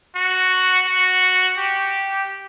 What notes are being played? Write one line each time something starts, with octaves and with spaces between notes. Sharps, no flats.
F#4
F#4
G4